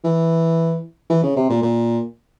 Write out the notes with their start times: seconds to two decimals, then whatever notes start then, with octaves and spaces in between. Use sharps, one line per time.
0.04 E3
1.10 E3
1.23 C#3
1.36 C3
1.50 A#2
1.62 A#2